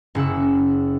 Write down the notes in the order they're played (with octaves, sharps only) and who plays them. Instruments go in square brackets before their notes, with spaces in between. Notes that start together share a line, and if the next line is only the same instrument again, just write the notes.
[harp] F#1 C#3 F#5 E6